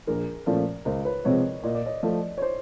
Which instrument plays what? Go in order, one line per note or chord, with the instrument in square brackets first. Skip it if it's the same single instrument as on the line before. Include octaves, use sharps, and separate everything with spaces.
[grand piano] A#1 [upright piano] G#4 A#4
[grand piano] A#2 F3 A3 C#4
[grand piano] C#2 [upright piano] A#4 C5
[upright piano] B4 C#5
[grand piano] C3 F3 G#3 C4 [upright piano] C#5 D#5
[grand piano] A#2 [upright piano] D#5
[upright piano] D5
C#5 D#5
[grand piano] F3 A3
[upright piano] C#5
C5 D5